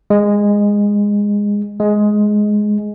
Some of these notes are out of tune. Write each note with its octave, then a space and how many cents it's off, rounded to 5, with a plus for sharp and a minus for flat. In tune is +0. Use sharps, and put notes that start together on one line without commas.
G#3 -15
G#3 +10